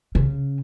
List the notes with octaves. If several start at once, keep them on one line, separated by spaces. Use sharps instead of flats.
C#3